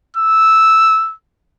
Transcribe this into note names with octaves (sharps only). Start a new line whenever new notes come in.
E6